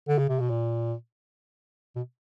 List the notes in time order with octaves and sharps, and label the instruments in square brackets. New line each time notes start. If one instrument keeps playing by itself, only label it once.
[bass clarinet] D3
C#3
C3
B2
A#2
B2